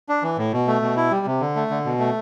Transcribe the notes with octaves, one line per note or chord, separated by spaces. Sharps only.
D4
E3
A2
B2
A3
B2
E4
G3
C3
D3
A3
D3
B2
A3